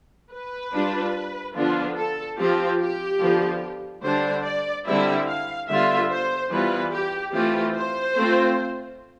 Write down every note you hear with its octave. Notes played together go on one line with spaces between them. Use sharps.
B4
G3 D4 F4
D3 F3 B3 D4 F4
A4
F3 C4 F4 G4
G4
D3 F3 B3
D3 G3 D4 C5
D5
D3 G3 C4 E4 E5
F5
D3 G3 B3 F4 E5
C5
E3 G3 B3 F4 B4
G4
E3 A3 C4 F4 G4
C5
A3 C4 F4